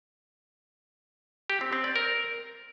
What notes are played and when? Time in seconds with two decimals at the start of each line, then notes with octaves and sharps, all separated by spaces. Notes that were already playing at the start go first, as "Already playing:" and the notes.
1.50 G4
1.61 C4
1.73 C4
1.84 D5
1.96 A#4